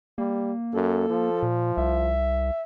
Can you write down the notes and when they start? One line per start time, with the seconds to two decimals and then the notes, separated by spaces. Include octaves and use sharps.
0.18 G3 A#3
0.74 F#2 A4
1.10 F3
1.43 A#2
1.77 C2 E5